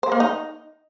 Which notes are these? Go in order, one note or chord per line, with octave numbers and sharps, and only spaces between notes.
C5
A#3
D#4